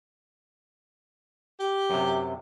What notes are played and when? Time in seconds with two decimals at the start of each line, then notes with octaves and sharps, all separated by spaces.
1.60 G4
1.90 F#2 C3